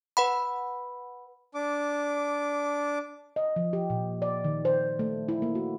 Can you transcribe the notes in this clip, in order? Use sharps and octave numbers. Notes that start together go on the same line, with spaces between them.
B4 F#5 B5
D4 D6
D#5
F3
G4
A#2
D5
D#3
C5
A3
E4
A#3
F#4